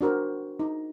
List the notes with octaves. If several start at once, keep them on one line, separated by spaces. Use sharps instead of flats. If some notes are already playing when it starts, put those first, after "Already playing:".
D4 F#4 A#4 C5
D#4